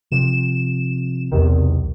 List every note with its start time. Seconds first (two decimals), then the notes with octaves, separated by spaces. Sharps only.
0.12 C3 F3 E7
1.31 B1 E2 C3 D#3